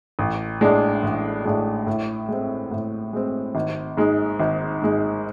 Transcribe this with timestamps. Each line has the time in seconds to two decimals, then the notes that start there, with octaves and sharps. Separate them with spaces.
0.19 A1
0.61 A2 G#3 D4
1.03 A1
1.45 A2 G#3 D4
1.87 A2
2.29 G#3 C4
2.71 A2
3.13 G#3 C4
3.55 G#1
3.97 G#2 G#3
4.40 G#1
4.81 G#2 G#3